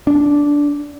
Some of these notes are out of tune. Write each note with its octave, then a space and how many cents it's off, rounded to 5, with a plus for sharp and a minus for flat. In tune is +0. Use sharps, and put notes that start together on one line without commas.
D4 -10